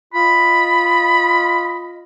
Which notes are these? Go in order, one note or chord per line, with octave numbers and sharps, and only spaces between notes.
F4 D#5 B5